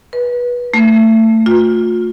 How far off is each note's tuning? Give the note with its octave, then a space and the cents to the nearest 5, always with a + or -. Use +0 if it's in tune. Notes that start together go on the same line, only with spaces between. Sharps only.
B4 -20
A3 +25
F4 +35